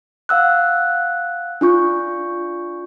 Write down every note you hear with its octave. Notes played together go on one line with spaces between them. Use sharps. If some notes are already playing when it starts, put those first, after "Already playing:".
F5 F#5 E6 F#6
D4 F4 C#6 G6